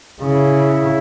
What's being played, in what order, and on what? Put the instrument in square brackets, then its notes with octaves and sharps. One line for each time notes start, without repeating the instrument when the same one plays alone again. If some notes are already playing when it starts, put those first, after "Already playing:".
[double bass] C#3 [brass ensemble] E4